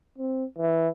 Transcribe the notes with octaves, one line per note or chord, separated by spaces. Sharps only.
C4
E3